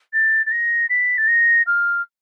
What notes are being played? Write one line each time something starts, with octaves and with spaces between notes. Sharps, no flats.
A6
A6
A#6
B6
A6
A#6
F6